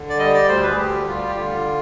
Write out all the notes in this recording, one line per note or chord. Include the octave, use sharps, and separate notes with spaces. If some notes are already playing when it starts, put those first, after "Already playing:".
Already playing: D3
D5
G3 D#5
D5
D2 C5
B4
G#4
D2 G4
G3 F4
G4
D3 F4